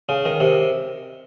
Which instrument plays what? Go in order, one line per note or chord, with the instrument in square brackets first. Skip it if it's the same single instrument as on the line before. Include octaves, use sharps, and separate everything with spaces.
[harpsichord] C#3
D#3
C3